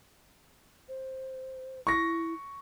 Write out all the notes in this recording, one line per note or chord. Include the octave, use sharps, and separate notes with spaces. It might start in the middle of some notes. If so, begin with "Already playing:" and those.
C5
E4 C#6 A#6